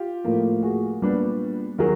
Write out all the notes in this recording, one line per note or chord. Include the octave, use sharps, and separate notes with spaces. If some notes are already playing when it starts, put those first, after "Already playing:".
Already playing: F4 G4
A2 F3 A#3
F#4 G#4
A#2 G3 B3 D4
D#3 F#3 G#4 A#4